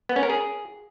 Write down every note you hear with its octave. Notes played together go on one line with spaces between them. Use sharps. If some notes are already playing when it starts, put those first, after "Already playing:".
B3
C#4
A#4
G#4